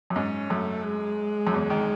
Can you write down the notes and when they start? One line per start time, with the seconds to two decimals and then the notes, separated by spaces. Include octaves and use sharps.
0.10 F#2
0.16 G#2 C#4
0.50 F#2 A3
0.85 G#3
1.47 F#2
1.54 E2
1.70 D#3